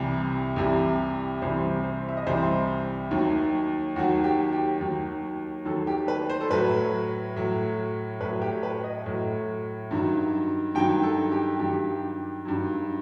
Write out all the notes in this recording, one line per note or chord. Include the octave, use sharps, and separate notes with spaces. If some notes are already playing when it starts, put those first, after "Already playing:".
Already playing: C2 C3 E3 G3
C2 C3 E3 G3
C2 C3 E3 G3 C5
C5
E5
D#5
C2 C3 E3 G3 C5
D#2 D#3 F#3
D#2 D#3 F#3 F#4
G4
G4
D#2 D#3 F#3
D#2 D#3 F#3 A4
G4
B4
C5
A4
A2 F#3 B4
A2 F#3
A2 F#3 B4
G4
B4
D#5
A2 F#3
G2 D#3 F#3
G2 D#3 F#3 G5
A4
G4
G2 D#3 F#3 G4
G2 D#3 F#3